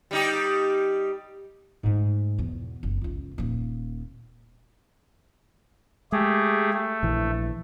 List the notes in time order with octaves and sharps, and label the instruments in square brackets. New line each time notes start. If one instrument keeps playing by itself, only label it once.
[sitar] G3 D#4 G4
[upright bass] G#2 A3
E2 B2
F#1
C#2 F4
D#1 A#3
[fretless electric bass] G#3 [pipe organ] A3 G4 G#4
[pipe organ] A3
[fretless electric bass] A#1 E3